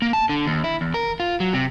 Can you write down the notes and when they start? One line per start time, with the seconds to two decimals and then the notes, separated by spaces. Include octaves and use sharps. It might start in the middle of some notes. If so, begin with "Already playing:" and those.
0.02 A#3
0.13 A5
0.29 D3
0.46 D#2
0.64 E4
0.81 E2
0.94 A#4
1.20 F4
1.40 F#3
1.53 C3